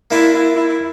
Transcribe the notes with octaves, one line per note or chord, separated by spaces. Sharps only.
A#3 D4 E4 F4
E4
E4
E4